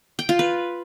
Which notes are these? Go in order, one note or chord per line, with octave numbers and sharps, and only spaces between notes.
G5
F4
B4